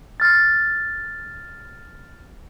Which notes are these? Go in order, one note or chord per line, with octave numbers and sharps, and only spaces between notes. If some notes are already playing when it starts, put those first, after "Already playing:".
F6 A6